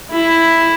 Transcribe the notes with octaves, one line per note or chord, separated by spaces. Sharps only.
E4